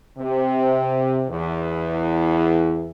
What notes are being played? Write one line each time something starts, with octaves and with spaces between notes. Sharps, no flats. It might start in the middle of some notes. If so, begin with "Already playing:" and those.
C3
E2